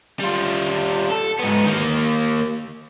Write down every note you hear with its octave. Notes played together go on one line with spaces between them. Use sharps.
G3 F4
A4
G#2 B3
D#3 A#3